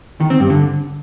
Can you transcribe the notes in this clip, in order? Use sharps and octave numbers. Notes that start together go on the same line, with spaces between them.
D#3
C4
G2
D3